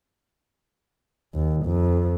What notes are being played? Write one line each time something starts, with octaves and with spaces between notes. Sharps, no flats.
D#2
F2